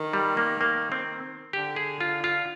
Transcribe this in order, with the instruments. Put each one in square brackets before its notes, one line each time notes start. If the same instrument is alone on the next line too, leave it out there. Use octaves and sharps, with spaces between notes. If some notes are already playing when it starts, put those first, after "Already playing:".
Already playing: [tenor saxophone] D#3
[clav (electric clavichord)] G3
A#3
A#3
C4
[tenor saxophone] D3 [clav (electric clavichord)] G4
[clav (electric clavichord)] G#4
F4
F4